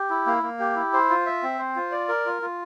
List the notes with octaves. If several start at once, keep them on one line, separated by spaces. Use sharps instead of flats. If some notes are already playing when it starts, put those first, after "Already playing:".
Already playing: G4
E4
A#3
A#3
G4
E4
C5
F4
E5
C4
C5
F4
D5
A#4
F4
F4